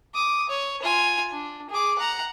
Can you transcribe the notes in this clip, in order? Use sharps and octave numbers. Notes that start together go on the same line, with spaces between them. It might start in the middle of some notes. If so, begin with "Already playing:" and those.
D6 D#6
C#5
F4 G#5
D4
G#4 D6
F#5 A#5